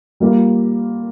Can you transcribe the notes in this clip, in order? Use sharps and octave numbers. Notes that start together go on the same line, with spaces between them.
G3 A#3 F4